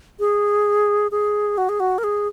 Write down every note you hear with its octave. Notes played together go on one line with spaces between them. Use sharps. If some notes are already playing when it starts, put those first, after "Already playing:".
G#4
G#4
F#4
G#4
F#4
A#4
G#4